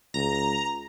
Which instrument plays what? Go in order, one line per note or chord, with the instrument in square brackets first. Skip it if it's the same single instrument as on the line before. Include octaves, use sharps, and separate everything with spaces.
[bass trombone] C#2 [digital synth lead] A#5